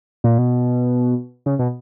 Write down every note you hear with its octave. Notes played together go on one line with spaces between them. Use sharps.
A#2
B2
C#3
B2